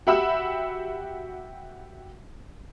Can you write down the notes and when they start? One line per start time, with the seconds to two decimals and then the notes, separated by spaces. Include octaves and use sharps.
0.07 F#4 G4 E5 F#5 B5 E6